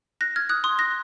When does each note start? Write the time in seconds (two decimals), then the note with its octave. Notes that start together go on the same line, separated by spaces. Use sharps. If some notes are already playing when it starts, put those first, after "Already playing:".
0.21 F#6 A#6
0.36 F6 G#6
0.49 D#6 F#6
0.64 C6 D#6
0.79 F#6 A#6